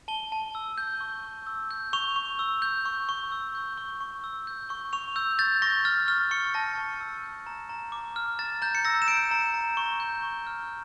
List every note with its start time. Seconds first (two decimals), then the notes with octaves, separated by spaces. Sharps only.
0.08 A5 G7
0.32 A5
0.54 E6 G7
0.78 G6
1.01 C#6
1.24 C#6
1.47 E6
1.71 G6
1.93 C#6 F7
2.16 C#6
2.39 E6
2.62 G6
2.86 C#6
3.09 C#6
3.32 E6
3.55 G6
3.78 C#6
4.01 C#6
4.24 E6
4.47 G6
4.69 C#6 G7
4.93 C#6 F7
5.16 E6 G6
5.39 G6 A6
5.62 C#6 A#6
5.85 F6 A6
6.08 F6
6.31 C#6 C#7
6.54 A5 A#6
6.78 A5
7.01 E6
7.24 G6
7.47 A#5
7.69 A#5
7.92 D6
8.16 F6
8.39 A#5 A6
8.62 A#5 G6
8.75 C#7
8.85 E6 A#6
9.02 E7
9.08 G6 D7
9.31 A#5
9.54 A#5
9.77 C#6
10.00 G6
10.23 C#6
10.47 F6